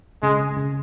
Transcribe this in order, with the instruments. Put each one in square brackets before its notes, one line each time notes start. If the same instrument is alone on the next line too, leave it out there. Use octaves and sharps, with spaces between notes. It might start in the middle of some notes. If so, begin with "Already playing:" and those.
[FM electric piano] C#3 [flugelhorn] G#3
[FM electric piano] C#3